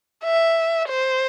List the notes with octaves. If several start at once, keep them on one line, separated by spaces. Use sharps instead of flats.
E5
C5